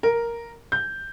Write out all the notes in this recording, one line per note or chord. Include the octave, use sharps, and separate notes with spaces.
A#4
G6